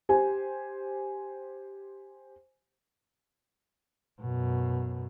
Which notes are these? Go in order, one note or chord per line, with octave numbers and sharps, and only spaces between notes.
G4 C5 G#5
F#2 B2